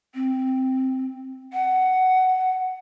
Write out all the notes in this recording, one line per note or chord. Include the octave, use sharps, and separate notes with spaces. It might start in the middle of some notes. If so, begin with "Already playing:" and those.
C4
F#5